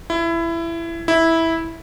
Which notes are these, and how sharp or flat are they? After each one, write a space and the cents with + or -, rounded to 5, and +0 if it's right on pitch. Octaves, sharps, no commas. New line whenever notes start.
E4 +20
E4 -10